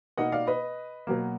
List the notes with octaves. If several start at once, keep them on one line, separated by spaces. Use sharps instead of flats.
B2 A#3 D#4 D#5 F#5
D5 F5
B4 D#5
B2 F#3 A#3